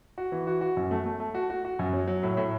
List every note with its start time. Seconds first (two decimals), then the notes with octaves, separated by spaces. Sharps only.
0.18 F#4
0.32 E3
0.47 F#4
0.61 F#4
0.77 F#2
0.91 A3
1.06 A3
1.20 A3
1.35 F#4
1.50 F#4
1.65 F#4
1.79 F#2
1.93 F#3
2.07 F#3
2.23 A2
2.37 A2